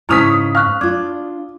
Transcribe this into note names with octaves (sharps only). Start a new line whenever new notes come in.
G#2 C#3 E4 C#6 D#6 F6 B6 F7
F5 C#6 F6 F#6
D4 F4 D6 G#6